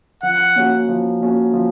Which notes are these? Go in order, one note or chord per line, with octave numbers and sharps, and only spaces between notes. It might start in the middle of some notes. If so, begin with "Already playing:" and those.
F3 F#5
A#3 C#4 F#4
F3
A#3 C#4 F#4
F3